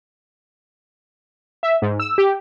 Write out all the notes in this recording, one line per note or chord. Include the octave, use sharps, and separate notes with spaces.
E5
G#2
E6
G4